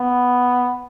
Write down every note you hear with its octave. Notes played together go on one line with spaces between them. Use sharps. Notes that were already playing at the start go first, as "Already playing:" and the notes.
Already playing: B3